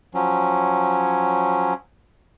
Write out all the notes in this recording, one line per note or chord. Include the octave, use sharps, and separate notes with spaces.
F3 F#3 C#4